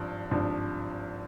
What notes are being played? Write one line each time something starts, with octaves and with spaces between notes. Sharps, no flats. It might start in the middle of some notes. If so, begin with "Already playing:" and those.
Already playing: G#1 G2 F3
G#1 G2 F3